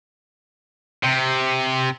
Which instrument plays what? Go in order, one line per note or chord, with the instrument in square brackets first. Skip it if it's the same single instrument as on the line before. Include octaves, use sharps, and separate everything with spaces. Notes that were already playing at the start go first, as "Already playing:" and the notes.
[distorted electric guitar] C3